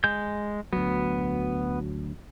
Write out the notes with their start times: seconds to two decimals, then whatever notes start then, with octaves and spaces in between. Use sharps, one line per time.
0.04 G#3 G6
0.73 D2 F#3 B3